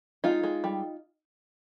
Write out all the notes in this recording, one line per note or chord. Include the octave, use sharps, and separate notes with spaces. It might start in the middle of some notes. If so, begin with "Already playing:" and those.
G#3 D#4 F4
G#3
G3